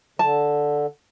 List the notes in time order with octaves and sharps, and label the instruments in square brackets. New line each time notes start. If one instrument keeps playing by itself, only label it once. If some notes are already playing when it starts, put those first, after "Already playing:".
[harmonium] D3 [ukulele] A5